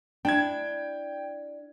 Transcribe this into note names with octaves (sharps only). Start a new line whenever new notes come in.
D4 E4 G5 G#6